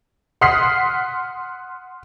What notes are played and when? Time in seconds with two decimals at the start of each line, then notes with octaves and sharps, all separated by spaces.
0.41 F#5 C6 D#6 F6 B6 C7